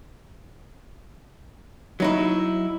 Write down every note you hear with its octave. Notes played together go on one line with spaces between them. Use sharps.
F#3 D#4 E4